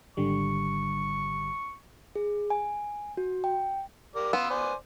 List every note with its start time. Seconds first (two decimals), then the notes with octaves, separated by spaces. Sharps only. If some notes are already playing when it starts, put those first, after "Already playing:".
0.17 G#1 D3 G3 C#6
2.16 G#4
2.50 G#5
3.17 F#4
3.44 G5
4.15 G4 A#4 D5
4.33 B3 F5 C6 E6
4.50 C5 D5 G#5